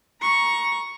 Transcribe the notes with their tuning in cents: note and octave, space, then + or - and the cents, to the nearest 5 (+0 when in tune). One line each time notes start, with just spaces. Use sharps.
A#5 +20 C#6 +0